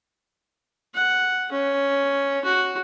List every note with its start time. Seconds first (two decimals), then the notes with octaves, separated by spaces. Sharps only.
0.94 F#5
1.52 C#4
2.44 F#4